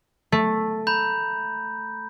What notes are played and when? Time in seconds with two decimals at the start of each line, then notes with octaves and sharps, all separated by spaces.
0.32 A3
0.87 A#5 B5 G6